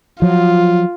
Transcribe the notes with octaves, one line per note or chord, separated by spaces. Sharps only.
F3 F#3 F4